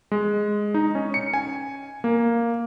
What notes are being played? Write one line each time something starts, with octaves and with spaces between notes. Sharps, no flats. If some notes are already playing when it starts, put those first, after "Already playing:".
G#3
D#4
C#4
C#7
G#5
A#3